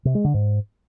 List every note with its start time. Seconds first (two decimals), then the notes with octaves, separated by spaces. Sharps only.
0.05 C3
0.15 G#3
0.24 D3
0.34 G#2